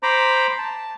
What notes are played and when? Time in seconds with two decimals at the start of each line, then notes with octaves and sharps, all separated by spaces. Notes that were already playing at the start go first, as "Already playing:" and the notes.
0.03 C5 A#5 B5 D6
0.59 A5